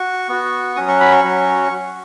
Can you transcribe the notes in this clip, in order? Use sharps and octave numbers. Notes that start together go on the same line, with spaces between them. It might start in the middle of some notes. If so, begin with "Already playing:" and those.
Already playing: F#4 C#6
B3 F#4
F#3 C#4 F#4 D#6
C#6
B5
C#6
F#3 C#4 F#4